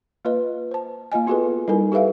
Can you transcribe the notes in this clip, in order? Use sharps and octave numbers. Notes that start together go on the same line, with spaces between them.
A#3 F4 B4 D#5
C5 A5
A#3 F4 D#5 G#5
B3 F4 F#4 G#4 A4 B4
G3 D#4 E4 A4 A#4 G#5
G4 A4 B4 E5 F5